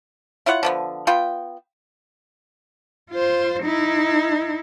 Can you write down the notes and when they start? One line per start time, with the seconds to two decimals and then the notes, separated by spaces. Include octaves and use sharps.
0.46 E4 F4 C#5 F#5
0.63 D3 F3 B3
1.07 B3 F4 G5
3.11 F4 C5
3.63 D#4 E4